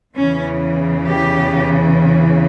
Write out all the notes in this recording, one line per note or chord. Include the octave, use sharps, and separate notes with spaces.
E2 C#3 E3 C#4
G4